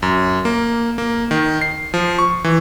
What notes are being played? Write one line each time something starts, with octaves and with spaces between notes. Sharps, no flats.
F#2
A#3
A#3
D#3
C7
F3
C#6
E3